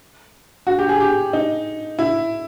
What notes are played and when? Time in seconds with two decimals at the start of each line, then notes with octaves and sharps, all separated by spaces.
0.67 F#4
0.79 G4
0.89 G#4
1.00 G4
1.33 D#4
1.99 E4